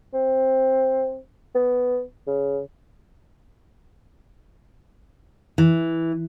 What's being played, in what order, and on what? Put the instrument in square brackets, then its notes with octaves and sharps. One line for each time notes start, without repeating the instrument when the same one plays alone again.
[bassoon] C4
B3
C#3
[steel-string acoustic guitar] E3